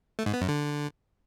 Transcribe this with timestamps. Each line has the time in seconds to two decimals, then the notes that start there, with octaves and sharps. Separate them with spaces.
0.19 A3
0.26 G#2
0.34 B3
0.41 F#2
0.48 D3